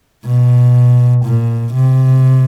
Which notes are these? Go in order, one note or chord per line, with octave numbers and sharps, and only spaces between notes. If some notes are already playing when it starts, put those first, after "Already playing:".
B2
A#2
C3